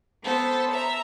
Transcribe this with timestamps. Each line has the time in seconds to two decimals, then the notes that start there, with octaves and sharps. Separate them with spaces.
0.23 B3 A4 C5
0.70 E5 A#5